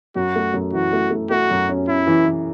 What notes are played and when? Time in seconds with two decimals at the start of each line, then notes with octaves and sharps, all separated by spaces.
0.15 F#2 F#4
0.36 A3
0.54 F#2
0.73 E3 F#4
0.93 A3
1.11 A3
1.31 A3 F#4
1.50 F#2
1.69 C#4
1.88 C#4 E4
2.07 E3
2.26 E3